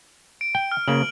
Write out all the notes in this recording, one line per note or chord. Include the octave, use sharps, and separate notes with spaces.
D7
G5
F6
C#3 A#3 F#7